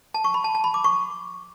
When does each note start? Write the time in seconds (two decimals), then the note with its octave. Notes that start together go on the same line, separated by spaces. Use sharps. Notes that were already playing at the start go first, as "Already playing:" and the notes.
0.14 A5
0.24 C#6
0.34 B5
0.44 A5
0.55 A5
0.64 B5
0.74 D6
0.84 C#6